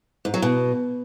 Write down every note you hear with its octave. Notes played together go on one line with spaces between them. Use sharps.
G#2
F#3
B2